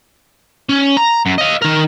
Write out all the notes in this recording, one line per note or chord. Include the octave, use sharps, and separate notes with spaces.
C#4
A#5
F#2
D#5 F5
D#3 A#4